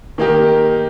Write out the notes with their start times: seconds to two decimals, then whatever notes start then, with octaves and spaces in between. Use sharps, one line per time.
0.18 D#3 A#3 D#4 G4